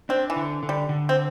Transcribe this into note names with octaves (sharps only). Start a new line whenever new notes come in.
C4 D4
E3
D3
D3
G3
D3
C4